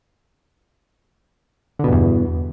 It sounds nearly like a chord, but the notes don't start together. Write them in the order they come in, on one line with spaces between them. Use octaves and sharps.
D3 B2 G2 E2